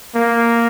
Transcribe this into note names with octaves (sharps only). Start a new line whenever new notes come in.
A#3